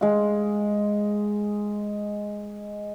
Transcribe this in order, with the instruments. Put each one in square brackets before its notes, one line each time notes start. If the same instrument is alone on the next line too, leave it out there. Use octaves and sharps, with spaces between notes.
[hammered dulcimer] G#3 F5